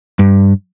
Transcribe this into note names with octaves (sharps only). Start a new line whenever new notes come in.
G2